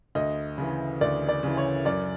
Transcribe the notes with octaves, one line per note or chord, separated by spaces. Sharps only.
D2 D#5
C#3 E3
D2 D5
D5
C#3 E3
C#5
F#2 D5